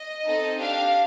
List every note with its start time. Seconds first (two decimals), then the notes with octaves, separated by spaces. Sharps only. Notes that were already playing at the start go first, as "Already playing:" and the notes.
Already playing: D#5
0.27 C4 D#4 A4
0.61 D4 G4 F5